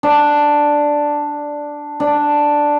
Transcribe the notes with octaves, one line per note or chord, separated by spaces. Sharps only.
D4
D4